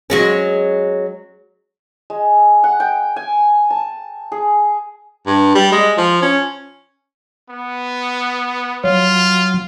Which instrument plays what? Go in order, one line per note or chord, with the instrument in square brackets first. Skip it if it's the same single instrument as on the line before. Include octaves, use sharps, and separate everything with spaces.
[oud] F#3 G#3 C#4
[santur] G#3
F#5
G5
G#5
A5
G#4
[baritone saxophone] G2
G3
G#3
F3
C#4
[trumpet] B3
[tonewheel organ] F#3 [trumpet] F4